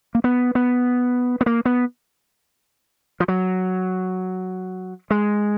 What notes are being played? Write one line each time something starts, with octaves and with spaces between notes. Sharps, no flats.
A#3
B3
B3
B3
A#3
B3
F3
F#3
G#3